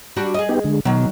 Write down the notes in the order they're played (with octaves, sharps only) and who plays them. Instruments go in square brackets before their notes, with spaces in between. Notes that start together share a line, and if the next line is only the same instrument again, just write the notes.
[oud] G3 D4 F#4
G#4 D#5
[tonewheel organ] B3 D#4 G4
D3 G#3
[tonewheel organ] B2 [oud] D#3 F#3